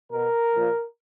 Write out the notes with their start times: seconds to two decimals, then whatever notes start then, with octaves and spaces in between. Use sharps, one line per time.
0.12 B2 A#4
0.53 A#2 F3